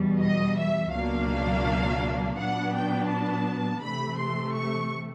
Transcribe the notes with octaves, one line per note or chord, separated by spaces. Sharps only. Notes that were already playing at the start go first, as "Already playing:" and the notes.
Already playing: E2 B2 G3
D#5
E5
C#2 B2 F#3 A#3 D4 F5
A#2 F#3 B3 D4 F#5
G5
A5
C3 E3 A3 B5
C6
C#6